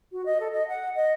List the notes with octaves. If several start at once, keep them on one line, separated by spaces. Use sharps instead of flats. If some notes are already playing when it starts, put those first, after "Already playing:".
F#4
D#5
A4
D#5
F#5
D#5